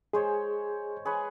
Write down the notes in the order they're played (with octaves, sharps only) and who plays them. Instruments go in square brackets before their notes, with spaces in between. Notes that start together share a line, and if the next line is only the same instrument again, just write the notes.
[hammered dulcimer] G#3 C5 C#5 [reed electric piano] G#4
[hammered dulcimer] G#4 B4 C#5